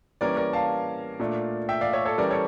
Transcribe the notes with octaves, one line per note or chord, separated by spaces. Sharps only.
E3 G3 A#3 C#4 A#4 D5
A#4 D5
F5 A5
A#2 A3 D4
E5 G5
D5 F5
C#5 E5
A4 C#5
E3 G3 C#4 A#4 D5
A4 C#5